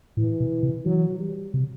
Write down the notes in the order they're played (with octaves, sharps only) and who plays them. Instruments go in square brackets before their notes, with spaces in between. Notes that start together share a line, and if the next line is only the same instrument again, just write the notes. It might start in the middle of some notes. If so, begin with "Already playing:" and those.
[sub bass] A2 [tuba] E3
[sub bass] B2
C3
[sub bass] E3 [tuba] F#3
[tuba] G3
[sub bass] C3